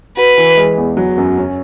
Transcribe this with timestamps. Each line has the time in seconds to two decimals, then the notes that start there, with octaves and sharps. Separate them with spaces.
0.17 F#4 B4
0.37 E3
0.57 G#3
0.78 E2
0.97 F#3
1.18 F#2
1.38 C#4